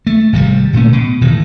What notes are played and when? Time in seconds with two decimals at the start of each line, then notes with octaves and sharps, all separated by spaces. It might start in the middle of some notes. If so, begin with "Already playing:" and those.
0.07 A3
0.33 G#1 C3 D#3 G3
0.73 D1 A#2 A3 C#4
0.93 B2
1.21 E1 A2 D#3